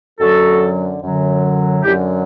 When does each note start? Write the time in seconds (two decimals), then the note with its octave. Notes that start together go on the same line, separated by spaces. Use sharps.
0.20 F#2 D3 F#3 F#4 A4
1.01 F#2 D3 F#3
1.84 F#2 D3 F#3 E4 G4